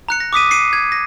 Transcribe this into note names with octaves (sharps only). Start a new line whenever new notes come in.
A#5 F#6 C#7
A#6
D6 D#6 B6 D#7
C7 C#7 D#7
G#6
A#6